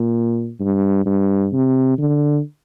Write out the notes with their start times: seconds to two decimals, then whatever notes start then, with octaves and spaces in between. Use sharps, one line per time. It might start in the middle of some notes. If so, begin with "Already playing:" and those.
Already playing: A#2
0.60 G2
1.06 G2
1.53 C3
1.98 D3